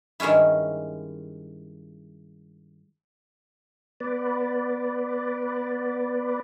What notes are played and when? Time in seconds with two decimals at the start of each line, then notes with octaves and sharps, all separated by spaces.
0.20 G2 D#3 G#3 C#4 E4
4.00 B3 B4 D5